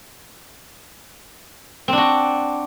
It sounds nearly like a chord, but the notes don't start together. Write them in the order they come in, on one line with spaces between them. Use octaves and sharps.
C4 D4 F#4